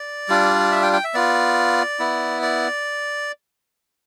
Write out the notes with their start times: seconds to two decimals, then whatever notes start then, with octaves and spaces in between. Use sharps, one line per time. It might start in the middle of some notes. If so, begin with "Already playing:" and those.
Already playing: D5
0.29 G3 D4 F4
0.72 E5
0.82 G5
0.93 G5
1.04 E5
1.14 B3 F4 D5
1.99 B3 E4
2.42 D5